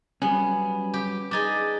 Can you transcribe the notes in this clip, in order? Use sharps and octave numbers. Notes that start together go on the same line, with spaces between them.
F#3 G3 B3 C#4 G#5
G4
D4 D#4 G#4 D6 A6